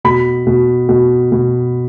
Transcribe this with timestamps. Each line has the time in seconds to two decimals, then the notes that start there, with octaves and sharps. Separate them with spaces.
0.05 B2 B5
0.47 B2
0.89 B2
1.32 B2